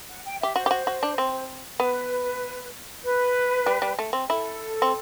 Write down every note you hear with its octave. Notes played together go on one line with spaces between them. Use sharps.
F#5
G5
G4 E5
F#4 C5
G4
F#4
F#4
D4
C4
B3 B4
B4
G3
G3
A3
C4
E4 A4
C4